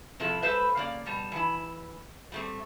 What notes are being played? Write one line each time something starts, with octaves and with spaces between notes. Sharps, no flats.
C3 F3 E4 A4
G#3 A4 B4 C5 E5
C#3 A#3 D5
B2 G3 A5
E3 E4
G3 A3 C4